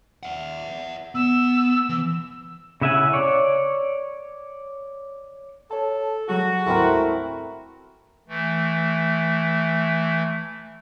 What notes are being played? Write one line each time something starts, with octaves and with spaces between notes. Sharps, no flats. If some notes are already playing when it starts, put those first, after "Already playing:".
E5 F#5
B3 E6
E3
C#3 E4 E5 F#5 G#5
C#5 D5
A4 C#5 A5
F#3 G3 F#4 G#4
D2 G#2 A3 C4 E4 A#4
E3 A3